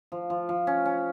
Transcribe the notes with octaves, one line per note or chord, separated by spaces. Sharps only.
F3
F3
F3
C#4
C#4